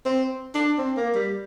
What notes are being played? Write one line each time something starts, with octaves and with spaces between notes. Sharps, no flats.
C4
D4
C4
A#3
G3